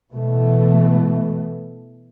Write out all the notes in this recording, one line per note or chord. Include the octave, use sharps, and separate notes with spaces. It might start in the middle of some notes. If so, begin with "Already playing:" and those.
B2 E3 A3